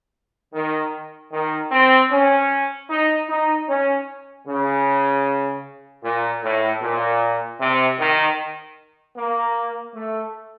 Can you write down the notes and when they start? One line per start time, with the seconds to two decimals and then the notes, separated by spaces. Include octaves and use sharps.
0.53 D#3
1.32 D#3
1.71 C4
2.10 C#4
2.88 D#4
3.28 D#4
3.67 C#4
4.46 C#3
6.02 A#2
6.42 A2
6.81 A#2
7.59 C3
7.98 D#3
9.16 A#3
9.94 A3